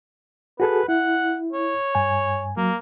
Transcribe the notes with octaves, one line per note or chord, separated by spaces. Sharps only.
F#4 G#4 A4 B4
E4 F#5
C#5
G2 G#5
F#3 A#3